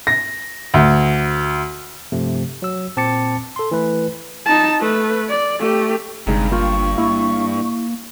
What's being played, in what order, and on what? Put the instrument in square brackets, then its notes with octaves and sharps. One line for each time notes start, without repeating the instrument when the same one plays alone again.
[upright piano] A#6
D2
[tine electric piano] G2 C3 F3 A3
F#3 E6
A#2 C4 A5 D6 A6 C#7
A4 C6
E3 A3 B4
[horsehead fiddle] D#4 A5
A3 B4
D5
A3 G4
[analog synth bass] G1 [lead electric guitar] G2 [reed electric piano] C3 G#3 D#4 [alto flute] A#5
[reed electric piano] A#3 F4 G5 [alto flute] C#6
[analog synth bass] A#3 [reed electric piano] E4